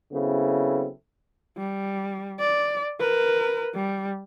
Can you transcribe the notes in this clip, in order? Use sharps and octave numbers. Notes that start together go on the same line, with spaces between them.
C#3 F#3 B3 C4 E4 A4
G3
D5
A#4 B4
G3